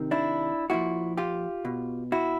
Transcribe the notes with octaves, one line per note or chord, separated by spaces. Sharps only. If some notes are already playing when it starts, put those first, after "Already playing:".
Already playing: C3 D#3
D4 E4
A#2 F3 E4 F#4
F4 G4
B2
E4 F#4